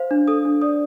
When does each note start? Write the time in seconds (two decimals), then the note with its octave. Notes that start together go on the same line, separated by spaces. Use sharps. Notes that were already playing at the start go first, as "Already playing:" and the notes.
Already playing: C5 F5
0.11 D4
0.27 A4 D#6
0.45 D4
0.62 D5 D#6